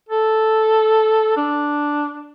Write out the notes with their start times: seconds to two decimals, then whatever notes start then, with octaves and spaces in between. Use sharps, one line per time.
0.09 A4
1.37 D4